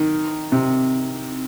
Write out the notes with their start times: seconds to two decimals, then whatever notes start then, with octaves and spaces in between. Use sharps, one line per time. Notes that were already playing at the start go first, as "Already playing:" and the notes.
Already playing: D#3
0.52 C3